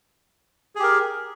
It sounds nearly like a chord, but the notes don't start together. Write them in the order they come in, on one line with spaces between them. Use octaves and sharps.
G#4 G4 A#4